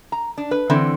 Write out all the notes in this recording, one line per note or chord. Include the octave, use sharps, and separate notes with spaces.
A#5
D4
B4
D3 E3 C4